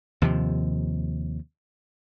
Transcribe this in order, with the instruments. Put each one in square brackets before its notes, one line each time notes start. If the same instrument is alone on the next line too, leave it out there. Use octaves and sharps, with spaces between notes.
[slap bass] D#2 C3 F3